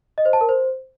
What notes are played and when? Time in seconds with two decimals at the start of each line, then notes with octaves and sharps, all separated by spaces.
0.18 D#5
0.25 C5
0.33 A5
0.41 A#4
0.49 C5